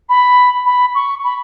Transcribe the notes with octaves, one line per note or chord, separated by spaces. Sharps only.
B5
B5
C#6
B5